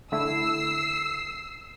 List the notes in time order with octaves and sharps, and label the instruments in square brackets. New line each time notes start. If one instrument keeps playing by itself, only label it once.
[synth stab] D3 A3 E4 [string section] E6 C7